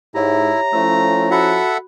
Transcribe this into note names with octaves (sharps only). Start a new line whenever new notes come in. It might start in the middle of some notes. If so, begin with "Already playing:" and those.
G#2 E4 G4 C#5 E5 A#5
F3 A3 C#4 E4 A4 C5 E6
F#4 A4 E5 F#5 B5 F#6